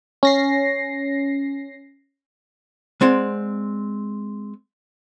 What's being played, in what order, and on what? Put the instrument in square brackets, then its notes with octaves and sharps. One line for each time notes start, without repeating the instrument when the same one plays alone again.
[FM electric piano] C#4 A#6 C7
[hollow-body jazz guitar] G#3 C4 D5 F#5